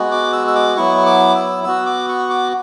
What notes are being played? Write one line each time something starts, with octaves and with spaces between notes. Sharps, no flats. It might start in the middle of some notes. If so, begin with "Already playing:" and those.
Already playing: G#3 B3 F#4
D6
E6
E6
D6
F#3 B3 E4 C#6
D6
E6
B3 F#4 E6
D6
C#6
D6